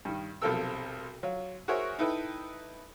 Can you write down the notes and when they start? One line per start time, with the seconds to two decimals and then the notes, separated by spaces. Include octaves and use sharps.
0.05 G2 D#3
0.42 B1 C3 F3 A4 A#4 E6
1.23 F#3 F4
1.68 F#4 G#4 A#4 C5 C#5 E5
1.99 D#4 E4 A4 B4 G5